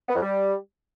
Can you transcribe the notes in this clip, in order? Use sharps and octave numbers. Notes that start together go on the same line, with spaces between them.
B3
F2
G3